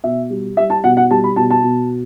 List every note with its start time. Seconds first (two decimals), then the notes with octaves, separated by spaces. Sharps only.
0.04 B2 E5
0.30 G3
0.57 G3 E5
0.70 A5
0.84 B2 F#5
0.97 F#5
1.11 G3 A5
1.24 B5
1.36 B2 A5
1.50 A5
1.63 B2